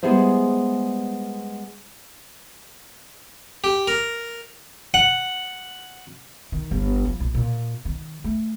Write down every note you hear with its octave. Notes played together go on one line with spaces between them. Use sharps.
G3 G#3 B3 E4 G#4 C5
G4
A#4
F#5
D#3
G1
F3
A#1
A#2
D#3
A3